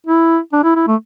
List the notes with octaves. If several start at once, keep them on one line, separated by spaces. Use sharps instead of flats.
E4
D4
E4
E4
A3